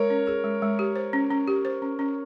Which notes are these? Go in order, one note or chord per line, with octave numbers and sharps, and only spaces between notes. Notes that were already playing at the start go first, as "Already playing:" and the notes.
Already playing: G#3 A#4 C#5
C#4
G#4
G#3
G#3
G4
C5
C#4
C#4
G4
C5
C#4
C#4